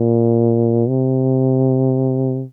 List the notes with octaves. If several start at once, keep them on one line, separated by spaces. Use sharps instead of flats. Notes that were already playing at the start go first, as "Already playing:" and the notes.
Already playing: A#2
C3